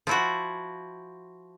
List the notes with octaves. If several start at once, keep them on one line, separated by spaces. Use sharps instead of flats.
F3 E4 F#4